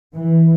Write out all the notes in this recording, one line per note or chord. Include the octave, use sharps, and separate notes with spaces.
E3